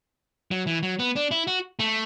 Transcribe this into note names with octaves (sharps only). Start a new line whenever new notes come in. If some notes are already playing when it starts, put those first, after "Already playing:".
F#3
E3
F#3
B3
D4
E4
F#4
A3